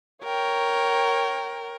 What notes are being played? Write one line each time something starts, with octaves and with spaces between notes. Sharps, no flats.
A#4 C#5 G5